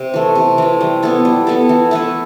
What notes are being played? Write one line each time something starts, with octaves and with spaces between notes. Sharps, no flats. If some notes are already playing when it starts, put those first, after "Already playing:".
Already playing: C3
E3 A3
C3
E3 A3
G3
B3 E4 A4
G3
B3 E4 A4
E3
A3 E4 B4